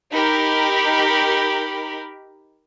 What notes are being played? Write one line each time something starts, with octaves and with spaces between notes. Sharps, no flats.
D#4 G4 A#4 B5